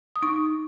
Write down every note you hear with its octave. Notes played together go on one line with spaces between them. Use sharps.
D#6
D#4 C#6